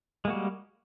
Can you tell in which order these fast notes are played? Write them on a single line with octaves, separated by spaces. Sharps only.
G#3 A#3 F#4 G3